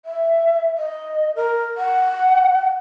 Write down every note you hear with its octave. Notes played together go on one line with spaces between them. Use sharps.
E5
D#5
A#4
F#5